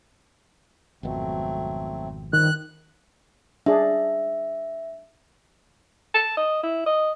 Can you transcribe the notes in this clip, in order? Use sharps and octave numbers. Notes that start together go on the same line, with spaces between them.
G#1 F2 B2 F#3 A3 C4
G2 D#3 F3 G3 F#6
D4 G#4 E5
A5
D#5
E4
D#5